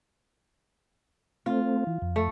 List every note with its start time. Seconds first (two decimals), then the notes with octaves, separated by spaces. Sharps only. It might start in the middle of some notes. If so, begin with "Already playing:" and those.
1.46 A3 C4 F4
1.87 E3
2.02 F2
2.16 A3